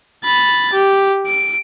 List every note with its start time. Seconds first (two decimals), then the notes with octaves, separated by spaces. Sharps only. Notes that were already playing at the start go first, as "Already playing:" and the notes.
0.24 B5 A6
0.73 G4
1.26 D7